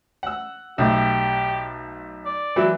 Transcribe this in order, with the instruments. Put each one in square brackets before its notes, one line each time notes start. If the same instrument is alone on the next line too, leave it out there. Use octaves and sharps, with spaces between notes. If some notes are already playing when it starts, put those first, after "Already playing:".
[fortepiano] F#5 E6
[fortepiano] B1 A2 [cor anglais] G4
[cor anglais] D5
[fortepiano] E3 F#3 E4